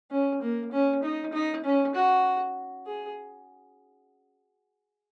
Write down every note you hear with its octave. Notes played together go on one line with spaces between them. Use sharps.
C#4
A#3
C#4
D#4
D#4
C#4
F#4
G#4